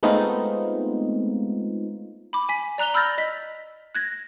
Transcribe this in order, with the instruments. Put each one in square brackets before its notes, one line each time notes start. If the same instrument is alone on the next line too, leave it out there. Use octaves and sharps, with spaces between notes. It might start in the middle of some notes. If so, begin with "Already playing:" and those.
[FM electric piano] G#3 A3 B3 C4 D#4 F4
[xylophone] B5 D6
G#5 B6
D5 A#5 F#6 F7 G7
B5 E6 F6 G6 A6 A#6
D#5 B6
F#6 G#6 A#6